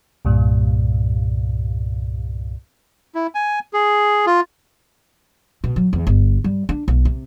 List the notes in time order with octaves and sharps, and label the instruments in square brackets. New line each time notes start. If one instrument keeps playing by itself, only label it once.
[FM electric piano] C2 G2 A#2
[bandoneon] E4
G#5
G#4
F4
[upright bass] B2
F#3
E2
G1
G3
D4
B1
C3